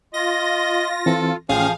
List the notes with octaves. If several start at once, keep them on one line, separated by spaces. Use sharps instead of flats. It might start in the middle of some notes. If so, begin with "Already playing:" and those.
F4 D#5 A#6
E3 C4 A4
A1 F3 C#4 G#4 F5 G5